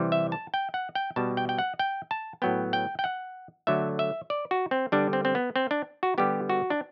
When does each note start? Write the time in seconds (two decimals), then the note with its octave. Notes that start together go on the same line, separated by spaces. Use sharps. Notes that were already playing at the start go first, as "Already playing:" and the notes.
Already playing: C3 E3 G3
0.12 E5
0.32 A5
0.54 G5
0.74 F#5
0.95 G5
1.16 B2 G3 B3 A5
1.37 G5
1.49 G5
1.59 F#5
1.79 G5
2.11 A5
2.42 A2 F#3 B3 G5
2.73 G5
2.99 G5
3.04 F#5
3.67 D3 F#3 A3 E5
3.99 E5
4.30 D5
4.51 F#4
4.71 C4
4.92 D3 G3 B3 D4
5.13 C4
5.25 C4
5.35 B3
5.56 C4
5.71 D4
6.03 F#4
6.18 D3 G3 B3 G4
6.49 F#4
6.70 D4